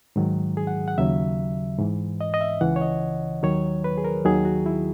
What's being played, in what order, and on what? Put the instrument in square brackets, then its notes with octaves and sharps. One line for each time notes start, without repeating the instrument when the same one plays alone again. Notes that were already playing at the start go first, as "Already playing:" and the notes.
[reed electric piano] G#2 D#3 F#3
G#4
F#5
F#5
D#2 C#3 F#3 E5
G#2 E3
D#5
D#5
E5
C#2 C#3 E3 F#5
C#5
D#5
D#2 D#3 F#3 C#5
B4
G#4
A#4
D#2 D#3 F#3 G#4
F#4
E4